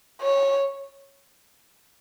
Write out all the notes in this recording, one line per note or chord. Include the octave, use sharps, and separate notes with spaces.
C#5